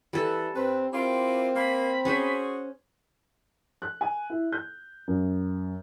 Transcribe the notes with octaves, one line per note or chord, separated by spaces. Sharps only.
E3 G3 A4
G2 C4 B4
C4 E4 F4 A#4 D6
A#3 B5
C#4 F#4 G#4 C5
F#6
G#5
E4
G6
F#2